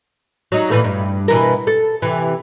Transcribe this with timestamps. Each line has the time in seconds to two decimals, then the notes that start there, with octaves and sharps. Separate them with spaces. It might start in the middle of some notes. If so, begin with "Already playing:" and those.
0.52 F#3 D#4
0.70 A#2 E3 A3
0.84 G2
1.28 B2 E3 A#4
1.67 A4
2.02 C3 E3